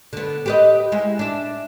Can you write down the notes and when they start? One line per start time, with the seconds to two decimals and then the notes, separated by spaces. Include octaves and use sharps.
0.13 D3 B3
0.46 G4 B4 D#5
0.92 G#3 E4
1.19 D4 E5